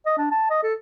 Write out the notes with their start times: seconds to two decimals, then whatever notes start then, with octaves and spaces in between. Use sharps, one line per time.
0.06 D#5
0.17 D4
0.31 A5
0.50 D#5
0.63 A4